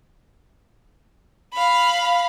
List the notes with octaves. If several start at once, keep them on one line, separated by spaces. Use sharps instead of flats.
F5 B5